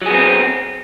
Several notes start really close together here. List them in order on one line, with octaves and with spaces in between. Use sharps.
F#3 G#4 B3 C4